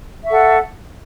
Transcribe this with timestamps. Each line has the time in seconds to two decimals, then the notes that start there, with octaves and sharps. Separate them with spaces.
0.24 E5
0.27 C#6
0.29 A4
0.32 F#5